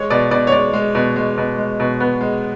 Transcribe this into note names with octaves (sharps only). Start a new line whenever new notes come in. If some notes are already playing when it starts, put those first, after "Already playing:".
Already playing: G#3 C#5
B2 D5
B2 D5
C#5
G#3 D5
G#3
B2
G#3
B2
G#3
B2
B3
G#3